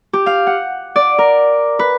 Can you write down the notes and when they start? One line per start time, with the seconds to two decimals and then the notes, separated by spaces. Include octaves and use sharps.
0.13 G4
0.26 F5
0.47 F#5
0.96 D5
1.18 A#4
1.79 B4